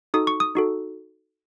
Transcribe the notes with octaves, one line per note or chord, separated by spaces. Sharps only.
D#4 F#4 A4 D#6
C#6
D#6
D#4 F#4 A4